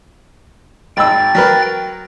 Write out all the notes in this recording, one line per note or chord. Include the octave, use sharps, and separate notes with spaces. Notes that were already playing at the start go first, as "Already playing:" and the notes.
G#1 G5 B5 E6 A6
F#3 A#4 B4